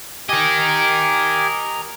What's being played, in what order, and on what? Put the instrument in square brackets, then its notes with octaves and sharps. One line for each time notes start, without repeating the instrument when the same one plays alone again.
[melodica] G4 G#5 [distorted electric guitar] A#4 D#5